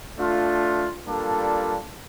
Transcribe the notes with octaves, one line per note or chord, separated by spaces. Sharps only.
A3 D4 F4
G3 A#3 D4 F4 A4